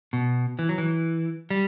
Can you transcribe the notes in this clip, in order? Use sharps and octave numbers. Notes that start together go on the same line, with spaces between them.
B2
E3
F#3
E3
G3